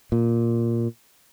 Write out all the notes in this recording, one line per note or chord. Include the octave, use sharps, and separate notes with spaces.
A#2